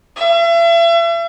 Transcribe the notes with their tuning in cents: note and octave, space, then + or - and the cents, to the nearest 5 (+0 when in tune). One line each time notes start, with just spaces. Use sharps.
E5 +40